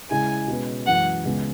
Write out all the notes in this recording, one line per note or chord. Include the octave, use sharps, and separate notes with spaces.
C#3 G#3 E4 G#4 G#5
B2 G#3 C#4 G#4 B4
F#2 E3 G#3 F#5
C#2 C#3 G#3 B3